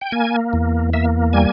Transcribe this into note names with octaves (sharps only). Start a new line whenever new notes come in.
G5
A#3 G#5
E2
A#3 E5
G3 G#5